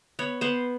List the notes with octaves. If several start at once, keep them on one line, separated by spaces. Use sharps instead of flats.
B3 C#5
B3 C5